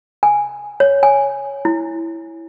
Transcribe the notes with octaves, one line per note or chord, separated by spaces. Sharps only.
G#5
C#5
G#5
E4